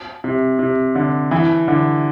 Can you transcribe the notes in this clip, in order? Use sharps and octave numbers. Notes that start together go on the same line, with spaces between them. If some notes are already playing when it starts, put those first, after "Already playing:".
C3
C3
D3
E3
D3